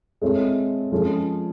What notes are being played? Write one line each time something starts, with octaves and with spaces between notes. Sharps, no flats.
G#3 C4 E4 A4 C#5
F3 G#3 C#4 F4 A4